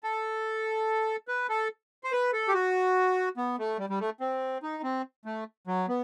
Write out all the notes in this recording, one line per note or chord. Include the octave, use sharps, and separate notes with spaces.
A4
B4
A4
C5
B4
A4
G4
F#4
B3
A3
G3
G3
A3
C4
D#4
C4
A3
F#3
B3